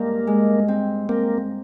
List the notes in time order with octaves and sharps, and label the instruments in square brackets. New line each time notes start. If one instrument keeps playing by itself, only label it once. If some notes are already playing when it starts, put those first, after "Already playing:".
Already playing: [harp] G2 G#3 [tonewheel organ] A#3
[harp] G#3
C4
[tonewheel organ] A#3 [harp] C4